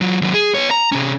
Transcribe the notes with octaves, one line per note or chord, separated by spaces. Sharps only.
F#3 F4
D#2 F#3
G#4
B3 C#5
A#5
C3 C#4